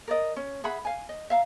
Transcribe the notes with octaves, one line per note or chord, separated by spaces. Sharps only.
A#4 D5 D#5
C#4
G#4 E5 F#5 B5
F5 G#5
D#5
E5 F5 A#5